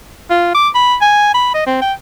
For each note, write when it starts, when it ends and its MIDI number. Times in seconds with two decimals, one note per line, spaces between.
0.30 0.50 65
0.55 0.69 86
0.75 0.96 83
1.01 1.34 80
1.34 1.51 83
1.54 1.66 75
1.67 1.80 60
1.82 1.93 79